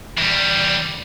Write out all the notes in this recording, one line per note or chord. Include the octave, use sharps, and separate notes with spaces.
E2 G3